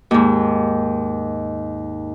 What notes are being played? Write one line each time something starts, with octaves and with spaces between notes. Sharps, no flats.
D#2 G#2